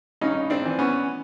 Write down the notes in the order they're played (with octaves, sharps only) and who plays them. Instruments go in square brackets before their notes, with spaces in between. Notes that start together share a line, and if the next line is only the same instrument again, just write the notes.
[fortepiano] G2 C#4 D#4
C4 D4
E3
B3 C#4